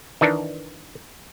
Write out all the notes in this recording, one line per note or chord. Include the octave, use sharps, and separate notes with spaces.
D#3 E3 D4 D#4